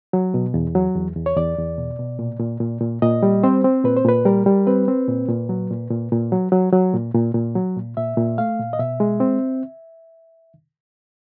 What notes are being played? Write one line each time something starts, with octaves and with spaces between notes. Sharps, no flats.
F#3
B2
E2
F#3
E2
E2
C#5
E2 D5
E2
B2
B2
A#2
A#2
A#2
A#2
A#2 D#5
G3
C4 C5
C4
A#2 B4
C5
A#2 B4
G3 A#4
G3
C4 B4
C4
A#2
A#2
F#3
A#2
A#2
A#2
F#3
F#3
F#3
A#2
A#2
A#2
F#3
A#2
A#2 E5
A#2
A3 F5
A#2
D#5
B2 E5
G#3
C4